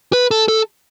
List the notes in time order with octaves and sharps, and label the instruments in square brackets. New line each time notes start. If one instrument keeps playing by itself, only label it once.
[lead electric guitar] B4
A4
A4